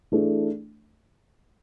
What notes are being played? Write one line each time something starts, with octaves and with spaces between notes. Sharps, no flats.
E3 A3 D4 G#4